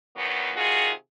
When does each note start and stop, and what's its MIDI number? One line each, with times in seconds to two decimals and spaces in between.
0.17 0.51 40
0.17 0.51 46
0.17 0.51 51
0.17 0.51 54
0.17 0.51 59
0.56 0.90 48
0.56 0.90 51
0.56 0.90 65
0.56 0.90 66
0.56 0.90 68